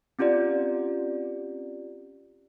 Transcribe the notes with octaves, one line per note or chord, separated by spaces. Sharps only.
C4 C#4 F4 G4 D5